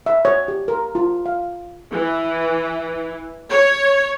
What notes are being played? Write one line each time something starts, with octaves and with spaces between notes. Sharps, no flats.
E5
C#5
G4
A#4
F4
F5
E3
C#5